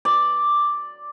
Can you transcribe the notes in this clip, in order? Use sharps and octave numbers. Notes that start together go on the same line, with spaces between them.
D5